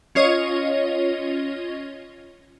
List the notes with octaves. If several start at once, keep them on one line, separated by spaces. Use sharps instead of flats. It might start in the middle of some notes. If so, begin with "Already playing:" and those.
C#4 F4 C#5 D#5